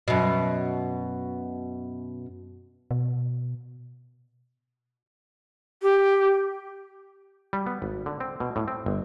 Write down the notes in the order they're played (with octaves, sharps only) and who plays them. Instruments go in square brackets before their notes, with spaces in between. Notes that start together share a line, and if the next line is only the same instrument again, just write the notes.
[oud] F#2 B2
[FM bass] B2
[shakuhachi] G4
[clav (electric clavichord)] G3
B3
G#1
D3
C4
B2
A2
C4
G1